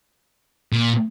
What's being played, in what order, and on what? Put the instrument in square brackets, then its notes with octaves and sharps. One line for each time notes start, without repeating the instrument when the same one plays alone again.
[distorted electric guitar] A#2